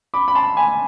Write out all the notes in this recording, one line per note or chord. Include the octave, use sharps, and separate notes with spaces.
B5 D6
B5
A5 C6
G#5 B5